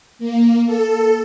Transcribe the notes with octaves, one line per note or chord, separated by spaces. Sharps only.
A#3
A4